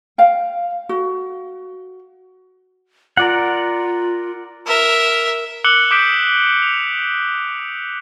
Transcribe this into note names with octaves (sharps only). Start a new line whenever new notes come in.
F5 G5
F#4
F4 A#4 D5 F#5
A#4 E5
D6 E6 F#6 C#7 F#7 G7
D6 D#6 G6 B6 D7 E7
F7